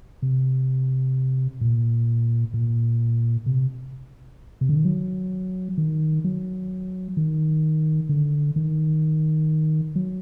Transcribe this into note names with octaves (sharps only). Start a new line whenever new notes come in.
C3
A#2
A#2
C3
C3
D3
D#3
F#3
D#3
F#3
D#3
D3
D#3
F#3